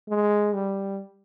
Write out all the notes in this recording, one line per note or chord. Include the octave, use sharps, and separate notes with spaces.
G#3
G3